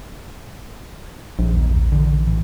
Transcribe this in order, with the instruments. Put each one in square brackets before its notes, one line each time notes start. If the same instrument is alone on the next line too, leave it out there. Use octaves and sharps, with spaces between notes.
[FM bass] A#1
[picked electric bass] D#2 D#3
F1
D3 E3
A2 E3